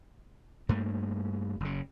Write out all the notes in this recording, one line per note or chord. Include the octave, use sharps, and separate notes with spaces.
G2 A3 A#3
F#1 C#3